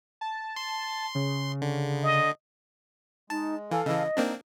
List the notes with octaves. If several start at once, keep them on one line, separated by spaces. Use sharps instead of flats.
A5
C6
C#3
D3
D#5
G#3 D#4 A5
E3 A4 F5 G#5
C#3 E3 D#5
A#3 C4 D4 D#4